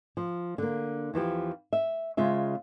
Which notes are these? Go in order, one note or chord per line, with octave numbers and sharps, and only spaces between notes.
F3
D3 A#3
E2 E3 F3 G4
E5
C#3 G#3 F4 E5